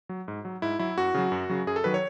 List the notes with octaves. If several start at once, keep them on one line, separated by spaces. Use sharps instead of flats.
F#3
G#2
F#3
G#2 E4
F#3 E4
F#2 F#4
C#3 F#3
F#2
C#3 F#3
F#2 G#4
A4
D#3 F#3 B4
C#5